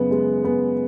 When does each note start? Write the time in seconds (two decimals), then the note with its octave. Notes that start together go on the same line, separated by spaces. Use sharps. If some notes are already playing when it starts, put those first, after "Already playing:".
Already playing: F#2 C#3 B3
0.11 G#3
0.44 B3